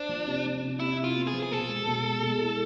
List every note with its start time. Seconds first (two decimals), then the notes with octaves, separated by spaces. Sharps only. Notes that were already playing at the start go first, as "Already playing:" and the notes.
Already playing: D4 C5
0.09 F3
0.27 C3
0.45 F3
0.63 C3
0.80 C3 E4
0.98 C3
1.04 F4
1.16 B3
1.27 G#4
1.34 F3
1.43 G#4
1.51 B2 A4
1.69 G#3
1.87 B2
2.05 G#3
2.23 G#3
2.41 E4